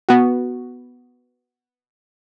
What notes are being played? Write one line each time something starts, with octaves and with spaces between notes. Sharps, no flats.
B3 F#4